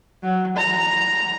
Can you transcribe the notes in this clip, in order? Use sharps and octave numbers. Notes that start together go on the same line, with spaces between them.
F#3
A#5